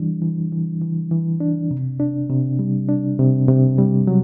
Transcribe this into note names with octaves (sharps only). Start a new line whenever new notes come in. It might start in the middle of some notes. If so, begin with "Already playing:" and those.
Already playing: E3 G3 D4
E3
E3
E3
E3
D4
C3
D4
C3
G3
D4
C3
C3
G3
F#3